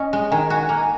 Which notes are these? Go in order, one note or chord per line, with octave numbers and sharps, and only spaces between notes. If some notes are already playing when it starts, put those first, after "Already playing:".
Already playing: C#4 D#5
G#3
D#3 G#5
F#4
A#3